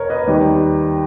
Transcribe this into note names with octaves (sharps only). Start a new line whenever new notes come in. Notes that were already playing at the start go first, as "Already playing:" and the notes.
Already playing: E2 B2 A#4 C#5
B4 D#5
D#2 D#3 G3